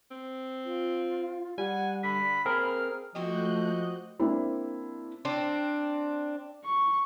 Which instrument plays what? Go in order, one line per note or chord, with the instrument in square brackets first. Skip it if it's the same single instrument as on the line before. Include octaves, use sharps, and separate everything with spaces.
[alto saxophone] C4
[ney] F4
[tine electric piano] G3 [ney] F#5 [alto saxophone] G#5
[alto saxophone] D3 [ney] B5 [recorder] B6
[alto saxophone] A#3 [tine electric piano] C4 G#4 A#4 [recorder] F6
[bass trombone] F3 [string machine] A3 F#6 G6 [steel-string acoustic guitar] A#3 C4 F#4 [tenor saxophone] D#5
[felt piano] A#3 C4 D4 E4 C5
[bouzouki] C4 D4
[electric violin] C#6